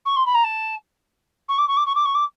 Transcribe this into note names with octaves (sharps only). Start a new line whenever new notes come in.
C#6
C6
B5
A#5
A5
C#6
D6
C#6
D6
C#6
D6
C#6
D6